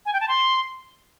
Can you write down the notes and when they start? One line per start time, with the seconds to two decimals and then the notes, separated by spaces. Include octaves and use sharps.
0.06 G#5
0.13 G5
0.21 A5
0.28 C6